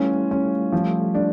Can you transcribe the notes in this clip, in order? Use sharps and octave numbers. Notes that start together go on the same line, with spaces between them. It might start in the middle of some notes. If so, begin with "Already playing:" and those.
Already playing: E3 G3 A3 C#4 F4
C#4
F3
D4